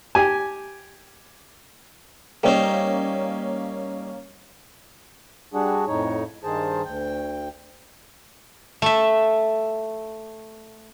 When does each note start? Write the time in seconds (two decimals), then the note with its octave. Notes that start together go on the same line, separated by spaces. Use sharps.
0.15 G4 G#5
2.43 G3 A#3 C#4 D#4 C5
5.53 G3 D4 F#4 G#4
5.87 F2 A2 D#4 C#5
6.44 G2 D#3 G#4 C5 A5
6.85 D2 G5
8.82 A3 E5